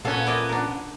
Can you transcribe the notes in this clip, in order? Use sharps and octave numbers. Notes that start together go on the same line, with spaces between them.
A#2 B3 C#4 A4 F5 F#5
E4 D5 D#5
D4 A#4